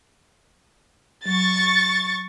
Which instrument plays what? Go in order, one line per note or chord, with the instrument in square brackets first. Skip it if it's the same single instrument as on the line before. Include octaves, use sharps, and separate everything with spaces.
[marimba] F#3 [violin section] C#6 A6